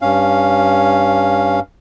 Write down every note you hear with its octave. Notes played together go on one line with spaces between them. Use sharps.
G2 C#4 F5